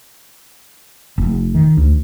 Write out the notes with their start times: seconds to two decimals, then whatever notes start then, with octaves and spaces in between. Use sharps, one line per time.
1.18 F1
1.55 D#3
1.77 D2